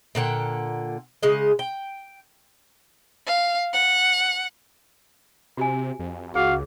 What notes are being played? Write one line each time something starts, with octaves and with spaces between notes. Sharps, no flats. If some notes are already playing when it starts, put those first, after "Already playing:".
A#2 D3 F#5 G5
C#3 G#3 D#5
G5
F5
F#5
C3 F#4 G4 G#5
F2
C#2 F#4 G#4 F5